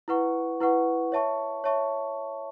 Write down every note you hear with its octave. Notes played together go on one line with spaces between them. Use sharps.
E4 B4 F#5 C#6
E4 B4 F#5 C#6
C#5 E5 A5 C#6
C#5 E5 A5 C#6